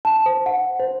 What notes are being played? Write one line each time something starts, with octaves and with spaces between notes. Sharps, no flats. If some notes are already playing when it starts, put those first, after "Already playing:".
A5
C5
F#5
C5